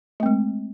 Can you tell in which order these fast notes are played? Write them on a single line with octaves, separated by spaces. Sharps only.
A3 C4 G#3